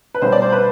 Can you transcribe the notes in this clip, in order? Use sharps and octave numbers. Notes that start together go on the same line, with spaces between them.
B4
B1 B2 G3 C5
D5
C5
B4